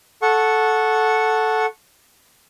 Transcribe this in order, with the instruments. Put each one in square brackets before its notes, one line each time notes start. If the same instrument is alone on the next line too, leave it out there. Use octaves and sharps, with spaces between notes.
[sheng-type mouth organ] A4 F#5 C#6